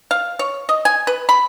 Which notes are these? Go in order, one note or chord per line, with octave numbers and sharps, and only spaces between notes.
F5
C#5
D#5
G#5
B4
B5